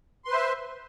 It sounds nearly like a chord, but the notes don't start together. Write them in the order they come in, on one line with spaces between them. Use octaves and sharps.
C6 B4 C5 E5